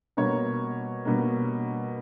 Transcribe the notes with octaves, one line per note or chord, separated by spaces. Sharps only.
B2 G3 A#3 C#5
B2 G3 A#3